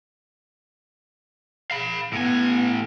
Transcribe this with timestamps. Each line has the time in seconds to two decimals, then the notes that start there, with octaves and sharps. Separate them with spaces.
1.71 F5 B5
2.13 A2 B3 G#5